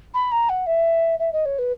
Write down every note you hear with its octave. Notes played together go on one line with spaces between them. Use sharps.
B5
A#5
F#5
E5
E5
D#5
C#5
B4